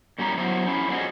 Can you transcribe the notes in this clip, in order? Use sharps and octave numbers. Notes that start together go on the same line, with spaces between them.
A#2 G3 C#4 E4 A#5
F#3 B3 E4 C5
C#4 E4
F#3 C4 C#4 F4 G#4 D#5